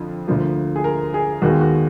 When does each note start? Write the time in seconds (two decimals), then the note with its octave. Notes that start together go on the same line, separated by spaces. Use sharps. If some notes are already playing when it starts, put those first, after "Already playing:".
Already playing: F2 D3 F3
0.27 D2 D3 F3 A#3
0.76 G#4
0.84 A#4
1.14 G#4
1.42 D#2 D#3 G#3 B3 F#4
1.61 F#4